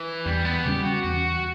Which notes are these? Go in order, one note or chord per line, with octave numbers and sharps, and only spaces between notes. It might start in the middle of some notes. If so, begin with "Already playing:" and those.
Already playing: E3
E2 G3
B3
C#3 G3 C#4 G4
F#4
E2 F#4